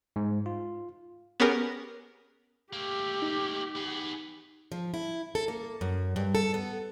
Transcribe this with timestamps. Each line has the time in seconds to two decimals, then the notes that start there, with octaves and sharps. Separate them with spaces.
0.16 G#2
0.46 F4
1.40 B3 C#4 G4 G#4 A#4
2.73 A3 A#3 G4
3.22 D#4
3.76 B3 G#4
4.72 F3
4.94 E4
5.35 A4
5.48 A#3
5.81 F#2
6.16 G2
6.35 A4
6.54 B3